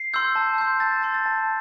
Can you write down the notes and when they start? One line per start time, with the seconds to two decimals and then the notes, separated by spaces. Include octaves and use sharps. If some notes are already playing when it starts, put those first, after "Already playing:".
Already playing: C7
0.14 C6 E6 G6
0.35 A5
0.58 C6 G6
0.80 A5 A6
0.92 A6
1.03 C6 G6 A6
1.14 A6
1.26 A5